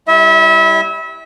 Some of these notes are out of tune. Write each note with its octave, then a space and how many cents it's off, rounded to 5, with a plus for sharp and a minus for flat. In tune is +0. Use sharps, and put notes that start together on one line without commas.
G3 +0 E4 +0 E5 -30